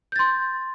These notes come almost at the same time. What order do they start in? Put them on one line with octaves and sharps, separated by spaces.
G6 A6 C6